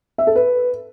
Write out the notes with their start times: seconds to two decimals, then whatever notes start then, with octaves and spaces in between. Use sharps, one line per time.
0.18 E5
0.27 A4
0.36 B4